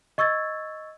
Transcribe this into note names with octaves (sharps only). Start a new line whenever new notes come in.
D#5 C#6 E6 G#6 A6